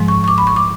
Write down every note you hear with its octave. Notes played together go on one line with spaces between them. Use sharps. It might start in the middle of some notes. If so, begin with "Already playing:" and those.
Already playing: G#2 F3 G#3
C#6
C#6
D6
B5
C#6
D6